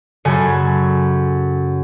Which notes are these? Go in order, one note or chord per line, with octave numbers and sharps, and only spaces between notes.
F#2 C#3 A4 G#5